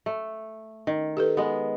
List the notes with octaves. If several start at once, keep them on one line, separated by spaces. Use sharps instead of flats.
A3
D#3
G4 A4 B4
G#3 B3